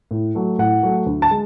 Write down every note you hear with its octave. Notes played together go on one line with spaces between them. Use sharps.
A2
F#3 A3
A2 F#5
F#3 A3
D2
A5
G#3